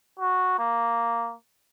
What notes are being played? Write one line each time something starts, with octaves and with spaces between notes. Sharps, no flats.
F#4
A#3